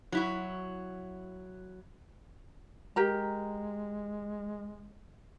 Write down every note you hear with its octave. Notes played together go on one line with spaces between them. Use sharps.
F#3 E4 F#4
G#3 G4 A#4 A#5